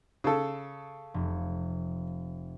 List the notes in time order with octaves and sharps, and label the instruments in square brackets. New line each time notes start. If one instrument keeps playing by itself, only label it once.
[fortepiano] C#3 A4
[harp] F1